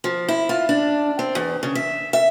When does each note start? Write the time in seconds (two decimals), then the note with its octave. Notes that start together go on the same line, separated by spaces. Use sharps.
0.04 F3
0.28 E4
0.49 F4
0.69 D4
1.19 C4
1.35 E2
1.63 C#3
1.75 E5
2.13 E5